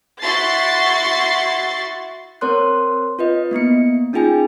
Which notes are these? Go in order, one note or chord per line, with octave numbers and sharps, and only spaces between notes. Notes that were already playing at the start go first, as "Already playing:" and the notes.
E4 F#4 C6 C#6 A6 C7
C4 A#4 C#5 C6 F#6
F4 B4 D#5
A#3 B3 E4 C#7
C#4 D#4 F4 G#4 G5 G#5